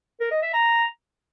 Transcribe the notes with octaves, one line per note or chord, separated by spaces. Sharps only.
A#4
D#5
E5
A#5